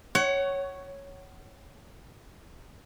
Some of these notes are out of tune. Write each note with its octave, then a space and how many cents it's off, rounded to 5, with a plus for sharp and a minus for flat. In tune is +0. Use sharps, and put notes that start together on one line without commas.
C#5 +0 F#5 +30